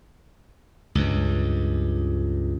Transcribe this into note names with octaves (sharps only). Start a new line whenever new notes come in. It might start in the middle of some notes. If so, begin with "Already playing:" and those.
C#2 G2